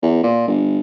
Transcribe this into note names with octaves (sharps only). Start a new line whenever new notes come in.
E2
A#2
G1